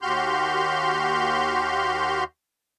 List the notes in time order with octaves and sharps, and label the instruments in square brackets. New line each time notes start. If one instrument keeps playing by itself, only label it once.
[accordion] D#2 F#4 G4 C6 F6 G6